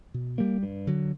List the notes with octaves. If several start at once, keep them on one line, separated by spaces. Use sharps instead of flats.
B2
G3 A#3
G2
D3 F#3